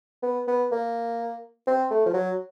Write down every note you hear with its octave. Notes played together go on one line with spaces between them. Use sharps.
B3
B3
A#3
C4
A3
F3
F#3